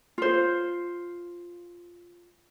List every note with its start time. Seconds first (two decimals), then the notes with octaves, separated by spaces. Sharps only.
0.18 F4 C5